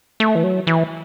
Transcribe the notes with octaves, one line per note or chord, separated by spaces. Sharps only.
A3
E3
F#3
E3